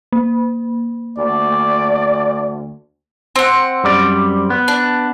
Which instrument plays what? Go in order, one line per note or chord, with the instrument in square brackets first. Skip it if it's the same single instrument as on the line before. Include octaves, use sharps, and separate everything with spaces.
[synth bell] A#3
[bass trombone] D2 [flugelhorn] D5
[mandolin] C4 F#5
[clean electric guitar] F#2 G3 D5
B3
[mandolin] D4